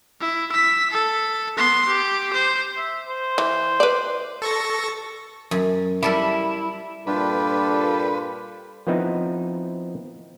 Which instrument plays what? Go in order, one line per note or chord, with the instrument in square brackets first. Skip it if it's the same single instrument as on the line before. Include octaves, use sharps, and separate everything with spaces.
[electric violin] E4
E6 B6
A4
B3 C6
G4
C5
[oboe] E5
C5
[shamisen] E3
B4 D5
[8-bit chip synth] A4 C#6 A#6
[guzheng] F#2
[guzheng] G3 A4 A#4 [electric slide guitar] E4
[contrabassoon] G2 [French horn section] A#2 A4 [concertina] D4 F4 G4 [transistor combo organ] B4
[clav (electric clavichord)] F3 B3 C4 D#4 E4